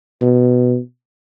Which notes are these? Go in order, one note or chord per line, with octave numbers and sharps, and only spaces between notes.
B2